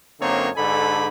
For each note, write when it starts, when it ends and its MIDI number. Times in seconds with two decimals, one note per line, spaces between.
0.21 0.49 42
0.21 0.49 50
0.21 0.49 58
0.21 0.49 60
0.21 0.49 63
0.21 0.49 73
0.56 1.07 44
0.56 1.07 50
0.56 1.07 62
0.56 1.07 69
0.56 1.07 80
0.56 1.07 83